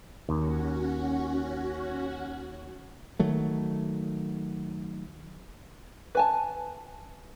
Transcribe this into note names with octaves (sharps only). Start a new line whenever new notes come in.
D#2 C#4 F#4
D#3 F#3 A3
B4 G#5 A5